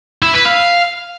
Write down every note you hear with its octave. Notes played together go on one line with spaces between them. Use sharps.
E4
B4
F5